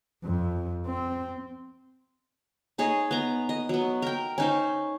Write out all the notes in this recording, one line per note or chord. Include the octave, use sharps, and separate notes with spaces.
F2
C4
D#4 G#4 C#5 D#5
B3 A#5
D#5
F#3 B3
A#4 G5
C#4 D#4 C5